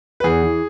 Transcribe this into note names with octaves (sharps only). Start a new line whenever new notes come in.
B4
E2 G#4
E3